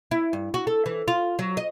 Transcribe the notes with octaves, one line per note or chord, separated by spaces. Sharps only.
E4
G2
F#4
A4
E3
F4
F#3
D#5